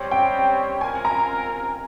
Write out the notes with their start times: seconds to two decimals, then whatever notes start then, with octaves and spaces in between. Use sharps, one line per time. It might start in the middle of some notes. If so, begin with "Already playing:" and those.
Already playing: G3 C4 G4 C#5
0.11 G5
0.81 C4 F4 A#4 G#5
1.05 A#5